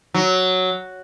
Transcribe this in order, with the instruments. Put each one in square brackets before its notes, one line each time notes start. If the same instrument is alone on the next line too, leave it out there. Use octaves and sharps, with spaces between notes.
[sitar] F#3